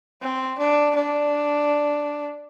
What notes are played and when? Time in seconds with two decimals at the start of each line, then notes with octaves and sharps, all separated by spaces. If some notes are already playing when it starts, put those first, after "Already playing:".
0.22 C4
0.58 D4
0.95 D4